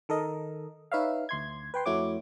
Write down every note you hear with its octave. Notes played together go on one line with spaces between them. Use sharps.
D#3 A4 A#4 D#5
D#4 B4 C#5 E5 F5
D2 C6 G#6
B4 G5 C6
F2 A3 E4 F#4 C#5 D6